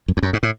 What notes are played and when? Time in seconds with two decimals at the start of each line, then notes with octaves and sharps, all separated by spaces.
0.08 F#2
0.17 E2
0.23 F#2
0.33 G#2
0.43 A2